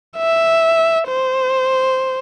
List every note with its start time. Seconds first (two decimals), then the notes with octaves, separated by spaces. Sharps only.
0.17 E5
1.09 C5